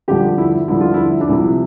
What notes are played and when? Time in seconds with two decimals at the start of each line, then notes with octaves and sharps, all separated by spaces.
0.08 G2 D3 F3 G4
0.38 E4
0.68 G2 D3 F3 E4
0.81 F4
0.94 E4
1.21 D4
1.29 C2 C3 F3 E4